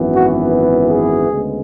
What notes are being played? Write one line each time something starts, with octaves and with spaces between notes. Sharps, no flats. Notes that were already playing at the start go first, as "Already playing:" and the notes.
Already playing: G#1 F#2 E3 B3
F#4
G#4
D2 C#3 G#3 B3